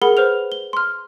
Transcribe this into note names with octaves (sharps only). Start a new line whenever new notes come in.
G#4 A#4 F#5 B5 G7
B4 C5 F6 F7
G7
C6 F6